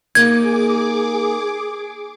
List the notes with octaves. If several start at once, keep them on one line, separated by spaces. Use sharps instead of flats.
A#3 D#4 G#4 D6 G#6